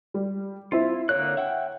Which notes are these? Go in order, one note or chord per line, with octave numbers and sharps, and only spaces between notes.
G3
C4 E4 F4 E5
D3 A#3 C#5 F#6
E5 F#5 G5